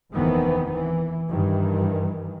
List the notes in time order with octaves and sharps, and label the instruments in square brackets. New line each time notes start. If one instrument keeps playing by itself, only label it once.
[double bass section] F1 D#2 D#3 E3 B3 C4
E3
G2 D#3 E3